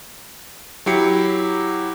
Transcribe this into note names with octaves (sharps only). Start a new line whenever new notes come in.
F#3 E4 G4 D6 C7 C#7